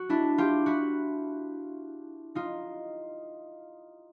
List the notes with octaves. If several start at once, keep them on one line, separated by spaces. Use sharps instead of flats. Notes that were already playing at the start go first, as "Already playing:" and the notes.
Already playing: F#4
D4 E4
F4 G4
E4 F#4
D#4 F4